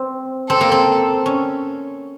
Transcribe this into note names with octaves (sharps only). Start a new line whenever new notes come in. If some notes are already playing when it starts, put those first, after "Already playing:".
Already playing: C4
C4 A4
A#3
C4
C#4